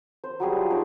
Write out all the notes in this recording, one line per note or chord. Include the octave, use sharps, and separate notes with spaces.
C5
F#3 G3 G#4 G#5
F3 G#5
G#3 C#4 D#4 D5